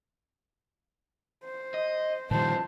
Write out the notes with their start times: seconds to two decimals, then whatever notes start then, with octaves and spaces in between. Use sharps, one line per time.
1.45 C5
1.74 D#5
2.31 G2 A#2 D#3 F3 G3 C5 A5